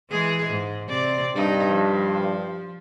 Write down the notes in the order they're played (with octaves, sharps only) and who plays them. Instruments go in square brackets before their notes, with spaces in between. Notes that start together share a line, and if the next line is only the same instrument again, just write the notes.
[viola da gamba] E3 G#3 G#4
G#2
C3 C4 D5
[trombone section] G2 [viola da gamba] D#4
[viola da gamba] F3